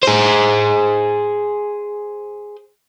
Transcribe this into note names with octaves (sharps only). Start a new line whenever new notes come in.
G#4 C5